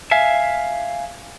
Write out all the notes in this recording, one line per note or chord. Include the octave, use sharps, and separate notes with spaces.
E5 F5 G#5